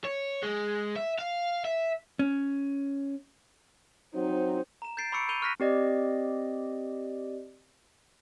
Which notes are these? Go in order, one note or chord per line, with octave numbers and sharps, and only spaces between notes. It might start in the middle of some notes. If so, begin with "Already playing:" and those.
C#5
G#3
E5
F5
E5
C#4
F#3 C4 D#4 C5
A#5 E7
G6 A6 C7 D7
B5 C#6 D6 E6 C#7 D7
B5 E6 G6 D#7 F7 G7
C#6 F6 F#6 A#6 B6 D#7
C4 G4 D5 D#5